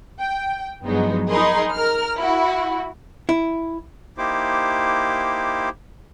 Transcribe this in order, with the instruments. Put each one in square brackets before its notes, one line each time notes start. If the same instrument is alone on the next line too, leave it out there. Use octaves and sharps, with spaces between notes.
[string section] G5
G2 F3 F#3 G#3 B3 D#4
D#4 G#4 A#4 D#5 B5 C6
A#4 F6
E4 F#4
[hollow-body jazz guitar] E4
[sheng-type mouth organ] A#3 D#4 E4 G4 C5 D6